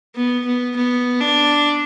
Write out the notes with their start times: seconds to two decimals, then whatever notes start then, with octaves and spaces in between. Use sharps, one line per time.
0.16 B3
0.46 B3
0.76 B3
1.21 D4